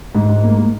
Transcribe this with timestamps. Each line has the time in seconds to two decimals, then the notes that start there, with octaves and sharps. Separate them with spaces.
0.15 G#2
0.29 G#2
0.43 A#3
0.58 A#3